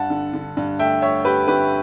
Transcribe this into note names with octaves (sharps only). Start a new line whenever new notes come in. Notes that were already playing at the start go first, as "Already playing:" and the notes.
Already playing: G2 F#5 A5
D3
D3
G2
A3 E5 G5
A3 C#5 E5
A3 G4 B4
D3 G4 B4